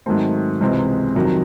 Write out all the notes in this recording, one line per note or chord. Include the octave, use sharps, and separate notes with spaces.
G#2 D#3 F#3 A3 C4
C#2 C3 E3 G#3 C4
F2 C3 D#3 F#3